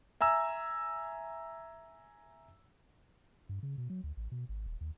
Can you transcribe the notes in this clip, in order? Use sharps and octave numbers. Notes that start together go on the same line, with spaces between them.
E5 G#5 A#5 E6
G2
C#3
B2
F#3
D2
A1
B2
G#1
D#1
D#2